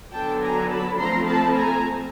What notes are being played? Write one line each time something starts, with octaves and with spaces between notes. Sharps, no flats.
D3 F#3 B3 D4 G5 A5
G#5 A#5
A5 B5
F3 A3 C4 A#5 C6
A5 B5
G#5 A#5